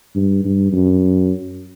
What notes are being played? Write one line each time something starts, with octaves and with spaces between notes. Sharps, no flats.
G2
G2
F#2